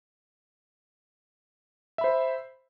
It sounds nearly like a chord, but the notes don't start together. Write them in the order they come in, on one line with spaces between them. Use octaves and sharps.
E5 B5 C5